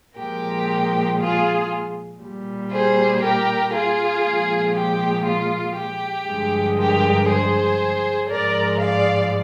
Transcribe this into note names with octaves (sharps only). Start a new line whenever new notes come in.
A#2 F3 G#3 G4 A#4
F4 G#4
A#2 G3
G#4 C5
G4 A#4
F4 G#4
A#2 F3 G#3
G4
F4
G4
G2 D3 F3 G#3
G4 A#4
G#4 C5
G#2 F3 G#3 A#4 D5
D5 F5